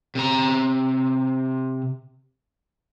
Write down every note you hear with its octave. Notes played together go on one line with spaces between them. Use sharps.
C3 A#5